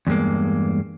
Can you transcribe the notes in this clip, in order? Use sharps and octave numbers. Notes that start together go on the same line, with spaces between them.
E2 G2 G#3 A#3